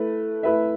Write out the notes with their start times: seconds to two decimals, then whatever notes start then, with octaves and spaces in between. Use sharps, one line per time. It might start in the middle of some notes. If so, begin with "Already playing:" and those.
Already playing: A3 E4 B4
0.43 A3 E4 B4 E5